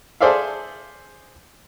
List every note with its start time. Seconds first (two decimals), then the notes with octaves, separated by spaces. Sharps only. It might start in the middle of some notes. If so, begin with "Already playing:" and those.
0.21 G#4 A4 C5 D5 E5 F5